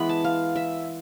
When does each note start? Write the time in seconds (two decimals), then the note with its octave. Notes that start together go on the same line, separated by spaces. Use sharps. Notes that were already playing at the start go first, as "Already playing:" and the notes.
Already playing: E3 G#3 B3 B5
0.09 A5
0.24 F5
0.56 E5